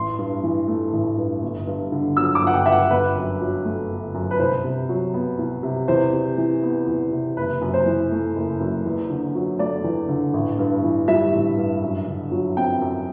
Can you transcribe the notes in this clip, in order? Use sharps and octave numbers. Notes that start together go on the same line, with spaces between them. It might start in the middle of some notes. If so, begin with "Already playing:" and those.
Already playing: A1 C6
G2
E3
A3
A1
G2
G1
G2
D3
F#3 E6
D6
G1
F#5
G5
G2 E5
F#5
G1 B4
F#2
F#3
A3
G1
F#2
B4
C2 C5
C3
F#3
B3
C2
C3
E2 C5
C3
E3
B3
E2
C3
F#1 B4
F#2
C5
E3
A3
F#1
F#2
E2
D3
F#3
A3 D5
E2
D3
A1
G2
E3
G3 E5
A1
G2
F#2
D3
F#3
C4 G5
F#2